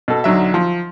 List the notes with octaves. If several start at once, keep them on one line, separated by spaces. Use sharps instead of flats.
B2 A4
B1 D3 F#3 E5
F3